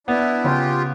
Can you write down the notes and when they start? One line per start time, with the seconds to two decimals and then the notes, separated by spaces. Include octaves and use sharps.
0.07 B3 D4 E4
0.44 C#3 F4 G4